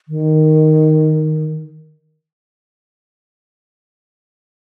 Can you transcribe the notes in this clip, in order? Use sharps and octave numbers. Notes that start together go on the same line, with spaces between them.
D#3